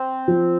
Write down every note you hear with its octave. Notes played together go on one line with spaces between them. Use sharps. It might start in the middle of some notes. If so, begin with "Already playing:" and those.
Already playing: C4
F3